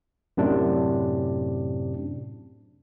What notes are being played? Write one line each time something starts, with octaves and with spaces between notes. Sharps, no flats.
F#2 A2 C3 D4